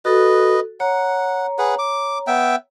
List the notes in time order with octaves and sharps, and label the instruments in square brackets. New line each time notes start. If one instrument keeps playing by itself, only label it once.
[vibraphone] F#4 A4 [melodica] B4 D#5
[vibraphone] C#5 A#5 [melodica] F#5
[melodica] G#4 B4 F#5
D6
B3 E5 G5